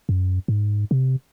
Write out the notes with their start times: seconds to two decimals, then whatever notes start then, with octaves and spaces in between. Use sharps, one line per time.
0.09 F#2
0.48 G#2
0.91 C3